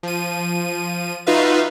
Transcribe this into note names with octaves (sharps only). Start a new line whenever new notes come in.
F3 D#7
D#4 F4 F#4 B4 E5 F5